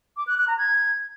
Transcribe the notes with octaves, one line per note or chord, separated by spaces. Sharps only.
D6
F#6
F#6
A#5
G#6